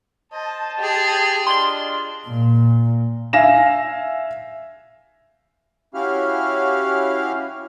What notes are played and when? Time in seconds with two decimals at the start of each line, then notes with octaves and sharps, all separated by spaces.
0.33 C5 D#5 A5
0.78 G4 G#4
1.47 D4 F4 D#5 C6 G7
2.27 A#2
3.33 E5 F5 G#5 A#6 E7
5.94 C#4 E4 F#4 G4 F5 F6